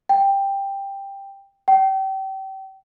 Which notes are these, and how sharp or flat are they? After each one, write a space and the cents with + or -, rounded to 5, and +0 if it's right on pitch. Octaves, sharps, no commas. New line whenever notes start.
G5 +10
G5 -30